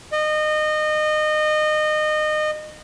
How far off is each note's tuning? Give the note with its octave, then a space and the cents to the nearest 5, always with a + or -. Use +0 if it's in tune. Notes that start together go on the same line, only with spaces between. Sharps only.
D#5 -25